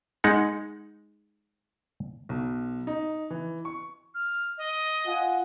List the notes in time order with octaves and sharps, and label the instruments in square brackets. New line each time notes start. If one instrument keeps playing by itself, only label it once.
[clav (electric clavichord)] G#3 D#4 F#5
[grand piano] B1
D#4
E3
C#6
[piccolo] F6
D#5
[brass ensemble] F4 F#5 G#5